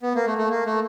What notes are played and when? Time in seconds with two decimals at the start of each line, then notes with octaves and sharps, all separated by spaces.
0.03 B3
0.15 A#3
0.26 A3
0.38 A3
0.50 A#3
0.66 A3